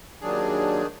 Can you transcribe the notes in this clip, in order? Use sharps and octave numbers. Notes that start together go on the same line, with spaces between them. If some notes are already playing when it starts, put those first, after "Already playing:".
D#2 D#3 F#3 D4 G#4